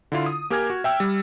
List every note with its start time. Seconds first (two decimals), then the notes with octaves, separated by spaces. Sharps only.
0.12 D3 E4 F4
0.26 D#6
0.50 A#3 G4 A#4 G#5 F6 G#6
0.70 F#4
0.84 E5 G5 E6
1.00 G3